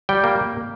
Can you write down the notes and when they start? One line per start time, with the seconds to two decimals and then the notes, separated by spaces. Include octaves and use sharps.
0.09 G3 G5
0.24 A#3